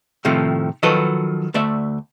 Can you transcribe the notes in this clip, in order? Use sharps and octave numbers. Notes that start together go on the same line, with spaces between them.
A2 C3 D#3 F3 A3
D#3 F3 F#3 F#4 A4 B4
D2 A3 D5 E5